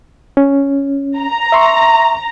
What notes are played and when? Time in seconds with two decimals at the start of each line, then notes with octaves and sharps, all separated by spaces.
0.37 C#4
1.18 A#5
1.52 E5 C6 C#6